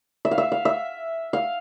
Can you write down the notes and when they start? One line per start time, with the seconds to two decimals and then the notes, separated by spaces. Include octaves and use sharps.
0.25 E5
0.31 F5
0.38 E5
0.52 F5
0.65 E5
1.33 F5